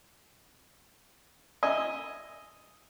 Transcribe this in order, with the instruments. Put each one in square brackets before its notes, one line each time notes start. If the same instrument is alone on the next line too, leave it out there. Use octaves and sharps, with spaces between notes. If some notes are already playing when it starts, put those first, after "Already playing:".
[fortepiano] D#5 E5 G#5